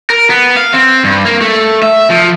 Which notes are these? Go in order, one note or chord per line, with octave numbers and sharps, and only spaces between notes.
A#4
B3
F5
C4
G2
A#3
A3
E5
F3